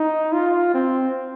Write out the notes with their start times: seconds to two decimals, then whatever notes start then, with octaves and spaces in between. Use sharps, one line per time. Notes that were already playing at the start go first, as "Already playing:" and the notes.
Already playing: D#4
0.33 F4
0.74 C4